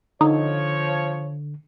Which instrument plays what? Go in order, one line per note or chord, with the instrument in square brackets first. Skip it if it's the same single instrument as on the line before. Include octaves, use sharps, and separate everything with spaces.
[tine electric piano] D3 [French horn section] F3 C#5 [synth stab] D#4